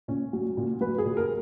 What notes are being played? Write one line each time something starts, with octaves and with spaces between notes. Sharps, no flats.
A#2 C#4
F#3
A#2
F#3 B4
G#4
A#2
A#4